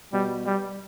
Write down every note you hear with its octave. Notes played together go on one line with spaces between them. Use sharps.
B2 G3
G3